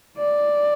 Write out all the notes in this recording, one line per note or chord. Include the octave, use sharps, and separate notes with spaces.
D5